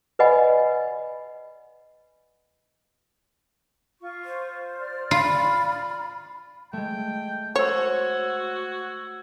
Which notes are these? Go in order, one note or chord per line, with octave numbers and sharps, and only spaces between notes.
B4 D5 D#5 F#5 G#5 B5
F4 C#6
C5
D5 F6
F4 B5
G#3 A3 G5
F#4 C5 C#5 E6 G#6